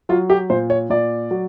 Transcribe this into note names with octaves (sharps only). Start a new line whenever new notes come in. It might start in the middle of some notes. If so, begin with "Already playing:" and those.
F#3 F4
G4
A#2 C5
C#5
A#2 D5
F#3